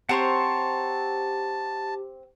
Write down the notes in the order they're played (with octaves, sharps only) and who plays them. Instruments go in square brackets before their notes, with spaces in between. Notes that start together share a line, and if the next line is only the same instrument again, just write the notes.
[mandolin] C4 C5 C#5 [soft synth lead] G4 [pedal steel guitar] F#5 A#5 C#6 [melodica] A5